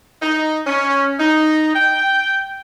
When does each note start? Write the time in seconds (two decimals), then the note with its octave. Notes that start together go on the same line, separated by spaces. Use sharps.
0.22 D#4
0.67 C#4
1.20 D#4
1.74 G5